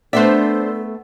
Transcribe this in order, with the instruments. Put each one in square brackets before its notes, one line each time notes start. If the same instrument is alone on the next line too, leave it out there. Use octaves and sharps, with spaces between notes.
[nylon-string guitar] A3 B3 E5 [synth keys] D4 C5 [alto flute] A4